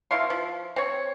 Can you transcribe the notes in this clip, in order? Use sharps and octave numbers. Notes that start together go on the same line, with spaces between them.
B2 E4 F5 C6
F3
C4 C#5